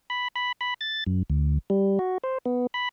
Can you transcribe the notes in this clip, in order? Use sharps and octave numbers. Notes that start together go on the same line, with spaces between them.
B5
B5
B5
A6
F#2
D2
G3
F#4
C5
B3
B5